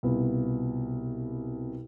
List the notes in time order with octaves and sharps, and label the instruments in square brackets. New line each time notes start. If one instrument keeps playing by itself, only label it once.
[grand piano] C2 B2 B3 F4 B4